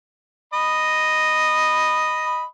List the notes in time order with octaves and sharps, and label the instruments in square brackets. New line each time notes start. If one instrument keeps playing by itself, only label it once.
[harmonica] D#5 B5